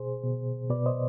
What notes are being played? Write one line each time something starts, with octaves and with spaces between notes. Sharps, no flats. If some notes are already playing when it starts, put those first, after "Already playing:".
Already playing: B2 G#4 C5
B2
B2 B4 D5
C5 D#5